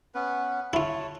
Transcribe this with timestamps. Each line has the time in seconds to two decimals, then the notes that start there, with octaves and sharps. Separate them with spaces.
0.15 B3 C#4 B4
0.73 E4 F4 C#5 A5